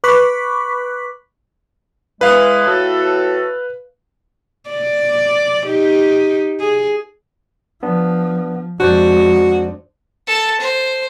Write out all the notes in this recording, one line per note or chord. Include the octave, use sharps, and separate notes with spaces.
B4 B5 C#6 D6 F#6 B6
E3 G#3 G#4 B4 F5
A2 F#4 A4
D5
D#4 G4
G#4
F3 B3 D4
F2 G#3 D4 F#4 C5 D5
A4 A5
C5